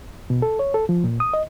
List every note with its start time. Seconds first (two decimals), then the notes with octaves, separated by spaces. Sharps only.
0.30 B2
0.42 A4
0.59 C#5
0.74 A4
0.89 F3
1.04 A#2
1.20 D#6
1.34 D#5